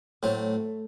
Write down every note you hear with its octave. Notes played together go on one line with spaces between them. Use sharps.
A2 F#3 A3 C4